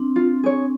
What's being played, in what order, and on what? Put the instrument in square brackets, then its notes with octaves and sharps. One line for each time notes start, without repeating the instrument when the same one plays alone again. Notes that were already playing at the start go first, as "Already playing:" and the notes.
Already playing: [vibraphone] C4 D4
[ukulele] F4
G#4 C#5